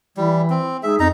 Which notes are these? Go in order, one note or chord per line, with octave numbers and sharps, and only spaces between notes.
E3 G3 E4
C4
G#3 D#4 G#4 E5
F2 D#4 A#5